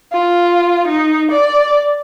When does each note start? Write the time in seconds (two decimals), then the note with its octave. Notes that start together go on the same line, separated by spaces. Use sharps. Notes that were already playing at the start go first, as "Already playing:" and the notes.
0.12 F4
0.87 D#4
1.31 D5